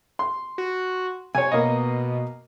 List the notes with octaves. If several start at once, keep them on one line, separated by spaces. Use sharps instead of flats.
C6
F#4
C3 C#5 G#5
B2 A#3 D#5